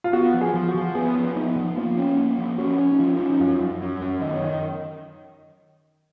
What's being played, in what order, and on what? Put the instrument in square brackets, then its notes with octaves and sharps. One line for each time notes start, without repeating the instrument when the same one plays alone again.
[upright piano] F4
[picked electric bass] B3 [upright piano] F#4
[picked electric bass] F3
[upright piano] G#4
[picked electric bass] F3
[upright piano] F#4
[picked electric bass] F3
[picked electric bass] B3 [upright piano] G#4
[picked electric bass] F3
[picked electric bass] B3 [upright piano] D#4
[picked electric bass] F3
[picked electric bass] A#3 [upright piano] F4
[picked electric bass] C#4
A#3
F3
[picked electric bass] C#4 [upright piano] F#4
[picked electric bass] C#4
[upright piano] D#4
[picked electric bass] F3 [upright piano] F4
[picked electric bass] C#4
[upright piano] D#4
[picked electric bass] F#2 [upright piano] F4
[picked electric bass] F#2
F#3
F#2
[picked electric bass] D#3 [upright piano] D#5
[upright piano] C#5
[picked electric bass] D#3 [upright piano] D#5